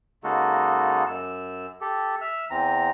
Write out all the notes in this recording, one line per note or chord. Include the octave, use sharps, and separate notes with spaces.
C#3 G#3 A#3 D#4 F#4 A4
F#2 E6
G4 A4
E5 E6 F6
E2 E3 C4 A#5